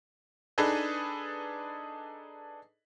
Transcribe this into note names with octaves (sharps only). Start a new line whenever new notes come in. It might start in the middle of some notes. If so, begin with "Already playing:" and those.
D4 D#4 G#4 A4 B4 D#5